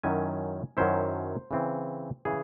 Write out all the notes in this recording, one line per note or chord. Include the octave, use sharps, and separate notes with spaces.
F#2 D#3 F#3 C#4 E4 G#5
F#2 D#3 F#3 C#4 E4 C5
C#3 E3 C4
C#3 E3 G#4